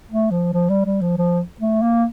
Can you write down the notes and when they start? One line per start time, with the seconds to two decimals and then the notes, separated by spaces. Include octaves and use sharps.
0.10 A3
0.31 F3
0.53 F3
0.70 G3
0.85 G3
1.01 F3
1.18 F3
1.60 A3
1.82 A#3